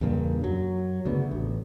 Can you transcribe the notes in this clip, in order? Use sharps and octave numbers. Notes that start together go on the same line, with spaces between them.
E2 G2 A#2 C#3
F#2 F#3
D2 C#3 B3
A1